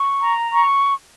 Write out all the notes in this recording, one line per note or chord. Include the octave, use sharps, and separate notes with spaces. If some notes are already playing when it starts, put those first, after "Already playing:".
Already playing: C#6
A#5
C#6